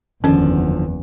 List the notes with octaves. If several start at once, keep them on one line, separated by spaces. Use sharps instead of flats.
F#1 E2 D3 D#3 F3 C#4